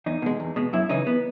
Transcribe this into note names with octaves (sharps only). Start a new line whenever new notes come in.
E2 D#4
B2 G#3
E2
B2 G#3
F#2 E4
C#3 E3 D#4
B3